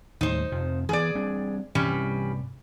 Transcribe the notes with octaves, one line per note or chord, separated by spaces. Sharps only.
D#2 A2 G3 D#4 C5
F2 C3 F3
E3 F3 B3 G#4 D5
G3 C4 D4
G2 C3 E3 G3 C#4